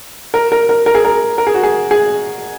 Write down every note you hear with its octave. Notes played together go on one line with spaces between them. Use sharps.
A#4
A#4
A#4
A#4
G#4
A#4
A#4
G#4
F#4
G#4
G#4